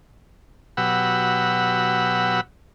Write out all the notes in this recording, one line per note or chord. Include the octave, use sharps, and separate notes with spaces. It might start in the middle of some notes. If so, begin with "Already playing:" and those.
B2 F#3 G4 F#5 B5 E6